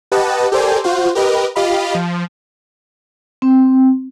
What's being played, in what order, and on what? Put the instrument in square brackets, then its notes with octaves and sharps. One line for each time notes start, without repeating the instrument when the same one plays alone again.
[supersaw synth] G4 B4 D#5 F#5 A5
G4 A4 A#4 C5 D5 G#5
F4 F#4 C5
G4 A#4 B4 D#5
F4 G4 D#5 F5 B5
F3
[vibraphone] C4